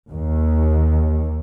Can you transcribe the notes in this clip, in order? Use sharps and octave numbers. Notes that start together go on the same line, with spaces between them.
D#2